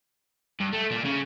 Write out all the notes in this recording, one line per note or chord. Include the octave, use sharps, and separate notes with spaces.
G2
A3
A#2
C#3